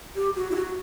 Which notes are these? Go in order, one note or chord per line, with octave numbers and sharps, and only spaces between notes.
G4
F#4
E4
F#4